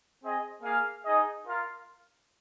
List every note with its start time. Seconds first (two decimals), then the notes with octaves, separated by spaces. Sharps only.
0.22 C4 G#4 D#5
0.62 A#3 G#4 F5
1.05 D#4 G#4 D#5
1.46 F4 A#4 F5